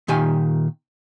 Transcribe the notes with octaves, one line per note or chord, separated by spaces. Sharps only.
A#2 D#3 G4 G#5